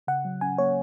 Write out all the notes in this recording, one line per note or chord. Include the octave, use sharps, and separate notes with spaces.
C#3 F#5
F#3
C#4 G#5
A#3 C#5